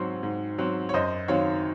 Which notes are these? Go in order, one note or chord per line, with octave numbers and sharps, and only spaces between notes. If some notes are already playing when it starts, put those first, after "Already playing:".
Already playing: G#2 F#3 C4
G#2
F#3 C4
C#5
F#2 C5 D#5
D#3 F#3 C4 C#5 F5